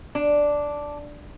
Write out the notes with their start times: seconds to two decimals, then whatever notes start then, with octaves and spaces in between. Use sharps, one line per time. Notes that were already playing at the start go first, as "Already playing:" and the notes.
0.15 D4